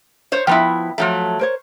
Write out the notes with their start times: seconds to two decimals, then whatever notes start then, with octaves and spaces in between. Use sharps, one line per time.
0.32 C5 C#5
0.47 F3 B3 E4 G5
0.98 F3 F#3 A3
1.39 A#4 C5 C#5